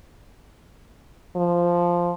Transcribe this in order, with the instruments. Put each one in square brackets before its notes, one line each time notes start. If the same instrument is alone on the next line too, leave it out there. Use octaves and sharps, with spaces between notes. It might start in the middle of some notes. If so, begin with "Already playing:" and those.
[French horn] F3